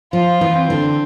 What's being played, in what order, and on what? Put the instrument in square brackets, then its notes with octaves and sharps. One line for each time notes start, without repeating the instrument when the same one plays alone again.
[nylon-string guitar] F3 [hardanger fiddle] F4
[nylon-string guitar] E3
[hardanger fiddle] C4
[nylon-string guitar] D3